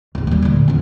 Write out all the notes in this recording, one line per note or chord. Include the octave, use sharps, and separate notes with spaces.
D1 A#3
D#2 G3
D2 A#2
E2 C#4